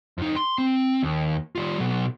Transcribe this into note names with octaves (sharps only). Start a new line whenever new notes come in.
F2 D#4
C6
C4
D#2
G3 F4
B2 F#3